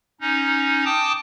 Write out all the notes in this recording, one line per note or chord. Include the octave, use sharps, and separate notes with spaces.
C#4 D#4
G5 A5 D6 D#6